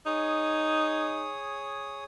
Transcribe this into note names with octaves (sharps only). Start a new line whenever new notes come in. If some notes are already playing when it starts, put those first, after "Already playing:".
D#4 G#4 C#5 D#6